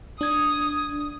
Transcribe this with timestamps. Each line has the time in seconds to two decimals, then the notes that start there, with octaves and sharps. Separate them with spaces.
0.21 D4 D#6 G#6